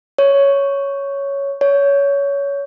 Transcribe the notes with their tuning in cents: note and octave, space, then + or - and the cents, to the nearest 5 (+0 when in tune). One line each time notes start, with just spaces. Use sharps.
C#5 +5
C#5 +20